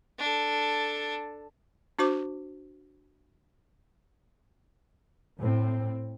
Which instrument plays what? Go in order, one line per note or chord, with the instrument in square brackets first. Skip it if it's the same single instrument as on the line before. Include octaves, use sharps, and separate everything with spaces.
[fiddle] D4 A4
[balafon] D4 F#4 C5 D6
[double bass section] A2 C4